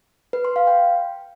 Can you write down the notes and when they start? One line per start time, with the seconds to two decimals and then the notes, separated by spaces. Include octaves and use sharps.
0.33 B4
0.45 C6
0.56 F5
0.67 G5